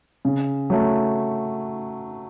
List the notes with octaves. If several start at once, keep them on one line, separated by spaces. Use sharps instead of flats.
C#3
F#3 A3